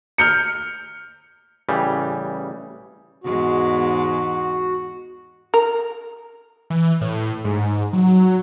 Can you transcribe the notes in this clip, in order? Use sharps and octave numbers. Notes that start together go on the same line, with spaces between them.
F6 G6 C#7
A1 C#3 E3 G3
E2 G#2 G#3 F#4
A#4
E3
A2
G#2
F#3